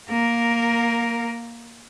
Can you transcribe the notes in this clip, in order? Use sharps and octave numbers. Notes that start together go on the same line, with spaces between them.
A#3 A#4